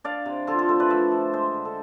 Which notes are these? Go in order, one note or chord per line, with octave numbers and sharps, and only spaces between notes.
D4 D5 F5
C3
D3 F4 A4
F4 A4
A3 A4 C5
B4 D5
F3 C5 E5
F3
G#3 C5 E5
D3
A4